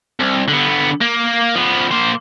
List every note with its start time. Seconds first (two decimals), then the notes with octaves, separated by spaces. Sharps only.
0.20 C2
0.49 D3 B3
1.01 A#3
1.55 F3 B3
1.91 A#3 C5